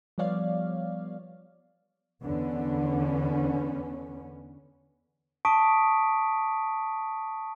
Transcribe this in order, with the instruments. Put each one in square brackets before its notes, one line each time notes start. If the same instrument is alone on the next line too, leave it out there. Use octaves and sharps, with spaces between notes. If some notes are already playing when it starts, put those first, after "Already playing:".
[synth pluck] F3 G3 B3 C#5 D5 F5
[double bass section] E2 D3 B3 C#4
[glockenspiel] A5 C#6 D#6 B6 D7